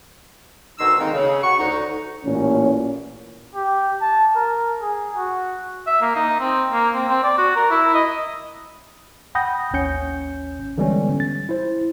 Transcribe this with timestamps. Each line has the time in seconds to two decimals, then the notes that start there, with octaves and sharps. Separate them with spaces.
0.79 D2 B2 D#3 D#4 C6 E6
0.99 D#3 G#3 A#3 C4 D#4
1.13 C#3
1.43 F#4 C#6
1.59 D2 D#4
2.25 A1 A#2 C#4
3.55 G4
4.01 A5
4.36 A#4
4.82 G#4
5.16 F#4
5.87 E5
6.01 A#3
6.16 D#4
6.40 C4
6.72 A#3
6.94 C4
7.09 C4
7.23 D5
7.38 F#4
7.56 A#4
7.71 E4
7.94 D#5
9.35 F#5 G5 B5 D#6 G6 A#6
9.73 A1 D#2 C#4 G6 C#7
10.78 D3 E3 G3 G#3 B3 C#4
11.20 A6
11.49 E4 C5